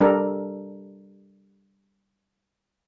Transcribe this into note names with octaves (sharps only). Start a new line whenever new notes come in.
G3 D4 A4 A#4